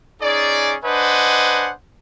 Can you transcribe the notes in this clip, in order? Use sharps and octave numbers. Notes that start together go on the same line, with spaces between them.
C#4 D#4 G#4 D5
D4 B4 C5 D#5 F#5 G#5